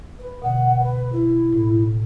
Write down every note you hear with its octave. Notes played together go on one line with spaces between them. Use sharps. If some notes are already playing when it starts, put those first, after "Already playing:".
B4
B2 D3 F#5
B4
E4
A2